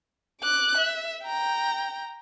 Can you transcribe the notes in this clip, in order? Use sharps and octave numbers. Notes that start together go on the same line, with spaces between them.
D6 F#6
E5
G5 A#5